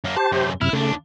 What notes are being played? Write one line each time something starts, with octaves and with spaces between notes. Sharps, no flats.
F#2 A#3
G4 C5 A5
F#2 C3
F#2 C3 E4 F6
D#2 C#3 A3 D4